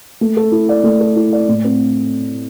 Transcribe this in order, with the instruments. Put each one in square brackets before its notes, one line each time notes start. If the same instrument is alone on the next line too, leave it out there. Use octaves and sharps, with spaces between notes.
[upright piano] A3
A4
E4
D5
A3
A4
E4
D5
A2
C4